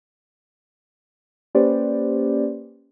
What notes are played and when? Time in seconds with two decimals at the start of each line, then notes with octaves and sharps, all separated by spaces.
1.55 A#3 C#4 G4 B4 C5 D5